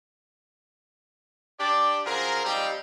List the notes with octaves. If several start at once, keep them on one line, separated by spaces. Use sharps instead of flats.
D4 G4 D5
F#2 F3 G#4 A#4
F3 G3 C4 D#4 G4